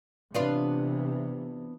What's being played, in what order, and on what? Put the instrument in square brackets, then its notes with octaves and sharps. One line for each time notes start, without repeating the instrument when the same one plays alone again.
[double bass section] C3 E3 [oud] B3 D4 F4